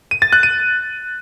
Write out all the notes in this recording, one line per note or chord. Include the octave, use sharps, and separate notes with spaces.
D#7
A6
F#6
D#7